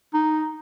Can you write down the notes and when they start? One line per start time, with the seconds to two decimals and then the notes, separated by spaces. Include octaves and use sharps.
0.14 D#4